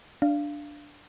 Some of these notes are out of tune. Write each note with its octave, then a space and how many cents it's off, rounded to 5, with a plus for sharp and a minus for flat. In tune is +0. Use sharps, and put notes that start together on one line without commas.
D4 +0 F5 -15